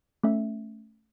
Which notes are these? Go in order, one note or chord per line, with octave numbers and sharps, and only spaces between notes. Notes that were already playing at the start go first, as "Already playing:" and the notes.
A3 C#4 E5